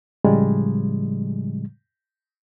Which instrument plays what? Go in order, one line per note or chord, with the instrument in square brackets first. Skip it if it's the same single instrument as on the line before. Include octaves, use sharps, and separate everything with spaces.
[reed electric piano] A2 C#3 F3 G3 G#3